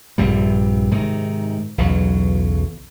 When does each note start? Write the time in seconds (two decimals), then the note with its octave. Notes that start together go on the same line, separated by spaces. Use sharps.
0.18 A#1 G2 C3 G3
0.91 G#2 C3 D#3
1.78 B1 E2 C#3 F#3